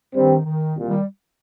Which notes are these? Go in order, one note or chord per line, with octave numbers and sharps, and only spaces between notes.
G2 D#3 G3 C4
D#3
C2 A#2
D#3 G3